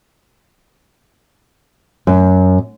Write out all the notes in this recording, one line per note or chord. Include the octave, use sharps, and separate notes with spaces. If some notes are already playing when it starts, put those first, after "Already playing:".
F#2